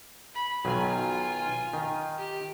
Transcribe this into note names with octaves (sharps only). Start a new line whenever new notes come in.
B5
B1 D#3 F#3 F4 G#5
D#3
G4